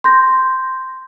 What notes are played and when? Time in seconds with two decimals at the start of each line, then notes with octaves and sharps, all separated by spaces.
0.04 C6 G6 A#6